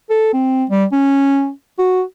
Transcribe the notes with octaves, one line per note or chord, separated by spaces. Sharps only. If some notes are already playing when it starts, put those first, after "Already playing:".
A4
C4
G3
C#4
F#4